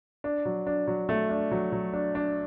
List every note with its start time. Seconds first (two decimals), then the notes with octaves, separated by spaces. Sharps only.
0.24 D4
0.45 F#3
0.67 D4
0.87 F#3
1.09 A3
1.29 D4
1.51 F#3
1.72 F#3
1.93 D4
2.15 D4